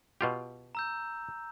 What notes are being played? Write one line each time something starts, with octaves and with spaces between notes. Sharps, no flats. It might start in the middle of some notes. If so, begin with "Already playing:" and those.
B2 F4 G4
A#5 E6 G6